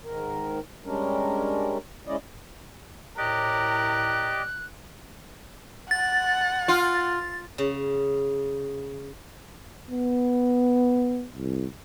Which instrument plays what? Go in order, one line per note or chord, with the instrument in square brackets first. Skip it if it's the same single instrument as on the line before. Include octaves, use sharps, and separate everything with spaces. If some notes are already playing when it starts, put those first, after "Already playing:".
[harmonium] G#2 D#3 A#4
G3 G#3 C#4 D4 A#4
G#3 C#4 E4 D5 D#5
[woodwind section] A2 [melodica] G4 D5 D#5 [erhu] A#4 [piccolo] F#6
[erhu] F#5 [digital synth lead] A6
[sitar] F4
[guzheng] C#3
[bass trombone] B3
C2